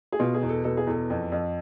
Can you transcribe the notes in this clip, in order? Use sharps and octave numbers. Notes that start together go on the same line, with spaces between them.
G#4
B2 F4
G#4
E2
A4
B2 A4
G#4
E2 A4
F2
F2